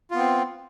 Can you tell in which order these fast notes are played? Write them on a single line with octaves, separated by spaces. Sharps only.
F4 B3 C4